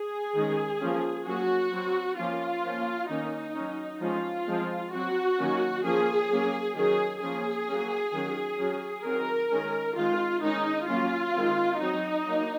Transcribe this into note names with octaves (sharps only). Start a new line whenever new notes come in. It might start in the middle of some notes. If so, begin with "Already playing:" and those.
Already playing: G#4
D#3 G#3 C#4
F3 A#3 C#4
F#3 A#3 C#4 F#4
F#3 C4
F3 A#3 C#4 F4
F3 A#3 C#4
D#3 A#3 C#4 D#4
F#3 C#4
F3 G#3 C#4 F4
F3 G#3 C4
F#3 C4 F#4
D#3 F#3 A#3 C#4
F3 A#3 C#4 G#4
F#3 A#3 C#4
D#3 F#3 C#4 G#4
F3 A#3 C#4 G#4
F#3 A#3 C#4
D#3 F#3 C#4
F#3 C#4
D#3 F#3 C4 A#4
D#3 G#3 C#4
D#3 G#3 C4 F4
D#3 G#3 C#4 D#4
F#3 A#3 C#4 F4
D#3 G#3 C4
F#3 C4 D#4
F#3 A#3